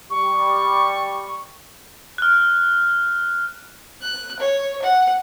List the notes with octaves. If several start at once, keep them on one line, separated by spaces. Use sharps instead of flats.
G3 C#6
F6 F#6
F#6
C#5
F#5